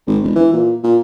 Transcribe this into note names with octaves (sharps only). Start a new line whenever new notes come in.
G#1
E1
E3
A#2
A#2